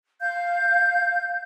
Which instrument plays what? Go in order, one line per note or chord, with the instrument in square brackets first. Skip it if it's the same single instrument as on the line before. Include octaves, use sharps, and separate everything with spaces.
[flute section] F5 G6